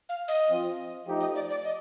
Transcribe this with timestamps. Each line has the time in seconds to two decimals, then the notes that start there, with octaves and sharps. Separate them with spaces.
0.09 F5
0.28 D#5
0.48 F3 C4 F4
1.06 F3 A3 D#4 G4
1.20 D#5
1.35 D5
1.50 D5
1.64 D#5